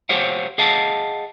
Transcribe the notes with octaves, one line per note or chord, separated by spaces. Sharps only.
G4 C5 C#5 F5 F#5
G#4 D#5 F5 F#5 A5